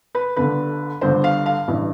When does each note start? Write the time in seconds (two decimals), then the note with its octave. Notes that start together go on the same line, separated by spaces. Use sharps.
0.15 B4
0.36 G1 G2 D3 B4
1.01 G1 G2 D3 C5
1.24 F5
1.46 F5
1.68 A1 G2 E3